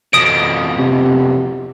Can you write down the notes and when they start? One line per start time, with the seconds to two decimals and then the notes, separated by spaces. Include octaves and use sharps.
0.13 F2 B2 D#6 D7
0.78 C3